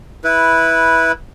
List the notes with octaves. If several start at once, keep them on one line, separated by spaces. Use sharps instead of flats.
E4 B4